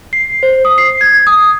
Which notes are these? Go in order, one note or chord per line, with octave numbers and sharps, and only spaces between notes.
C7
C5
D#6
C7
G#6
D#6